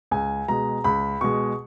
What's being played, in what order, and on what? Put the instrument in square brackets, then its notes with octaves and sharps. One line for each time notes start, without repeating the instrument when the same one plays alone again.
[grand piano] C#2 G#5
B2 G#3 A#5
C#2 B5
B2 G#3 C#6